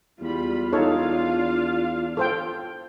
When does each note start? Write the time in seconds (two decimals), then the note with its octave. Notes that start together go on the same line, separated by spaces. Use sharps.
0.21 E2 G3 F4 B5
0.73 D4 D#4 A4 C#5 F5
2.17 A4 C5 G5